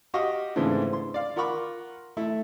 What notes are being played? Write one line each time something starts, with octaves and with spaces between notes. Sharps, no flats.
F#4 G4 D#5 F5 C#6
G#2 C#3 E3 A3 C4 D4
C6
D5 F5
F4 A#4 F#5 B5 C#6 D6
A3 E4